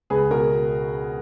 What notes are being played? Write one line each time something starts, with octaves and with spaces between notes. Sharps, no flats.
C#2 G#4 B4
B2 F#4 A#4
B2